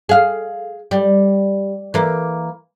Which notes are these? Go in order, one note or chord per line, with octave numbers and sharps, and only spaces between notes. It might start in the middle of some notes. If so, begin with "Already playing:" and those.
G#4 F5
G3
E3 A#3